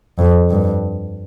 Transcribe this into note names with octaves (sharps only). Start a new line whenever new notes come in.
F2
G2